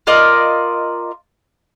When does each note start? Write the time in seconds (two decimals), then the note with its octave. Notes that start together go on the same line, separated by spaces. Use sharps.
0.07 F4 A#4 D5 D#5